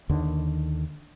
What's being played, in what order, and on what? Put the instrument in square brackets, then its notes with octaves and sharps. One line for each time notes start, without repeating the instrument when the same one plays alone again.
[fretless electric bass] D#2 D3 D#3